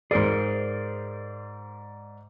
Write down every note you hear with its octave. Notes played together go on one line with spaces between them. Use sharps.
G#2 G#4 A#4 C5 D5